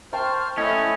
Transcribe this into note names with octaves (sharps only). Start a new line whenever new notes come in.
C5 G5 A5 C#6 F6
A3 C#4 E4 D#5